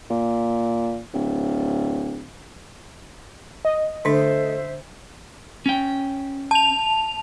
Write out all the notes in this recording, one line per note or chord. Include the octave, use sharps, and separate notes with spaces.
A#2
D1
D#5
D3 A3 D4 C5 E5
C#4 G5
A5 F7